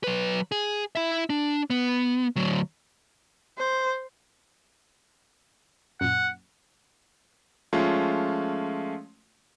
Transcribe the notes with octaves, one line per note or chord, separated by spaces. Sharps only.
F#3 B4
G#4
E4 E5
D4
B3
D2 F#3
C5
F#2 A#2 F#5
F3 G#3 A3 C#4 F4